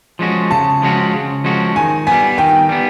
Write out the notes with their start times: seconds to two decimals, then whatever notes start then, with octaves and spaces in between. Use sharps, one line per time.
0.19 F3 G#3 C#4 F#4
0.51 C#3 A5
0.82 F3 G#3 C#4 F#4
1.13 C#3
1.44 F3 G#3 C#4 F#4
1.76 D#3 G#5
2.07 G3 B3 G#5
2.38 D#3 G5
2.69 G3 B3